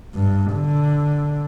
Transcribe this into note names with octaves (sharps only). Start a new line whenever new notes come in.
G2
D3